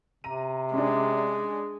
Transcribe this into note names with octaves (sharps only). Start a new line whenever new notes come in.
C3 A#5 D#7
G#3 C#4 D4